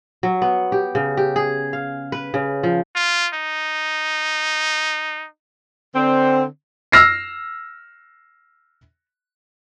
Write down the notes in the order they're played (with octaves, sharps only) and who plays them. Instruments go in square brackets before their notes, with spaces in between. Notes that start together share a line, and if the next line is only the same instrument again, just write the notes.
[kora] F#3
B3
G4
C#3
G4
G#4
F5
B4
C#3
F3
[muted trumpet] F4
D#4
[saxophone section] D3 C4
[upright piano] E6 F6 A#6 C7